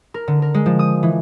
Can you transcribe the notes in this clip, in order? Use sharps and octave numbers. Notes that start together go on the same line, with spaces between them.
A#4
D3
A#4
G#3
F3
D#6
E3